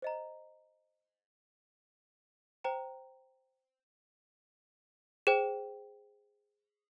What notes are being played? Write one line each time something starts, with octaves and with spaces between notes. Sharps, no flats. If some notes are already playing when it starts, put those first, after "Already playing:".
C5 D#5 A#5
C5 G5 A#5
G#4 C5 G5